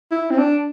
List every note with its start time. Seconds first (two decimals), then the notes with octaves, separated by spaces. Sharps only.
0.12 E4
0.30 C4
0.38 D4